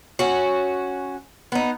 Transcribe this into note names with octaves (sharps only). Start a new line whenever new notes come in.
C#4 F#4
B3 D#4